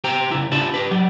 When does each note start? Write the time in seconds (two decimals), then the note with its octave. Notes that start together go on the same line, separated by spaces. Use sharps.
0.04 G4 C5 G5 A#5
0.31 C#3 E4
0.52 D4 E4 F4 G4 D5 A5
0.74 G4 B4
0.91 F#3 G4